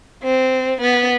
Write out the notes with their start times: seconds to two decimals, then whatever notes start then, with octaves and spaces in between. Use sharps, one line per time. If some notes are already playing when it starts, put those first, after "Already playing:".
0.23 C4
0.81 B3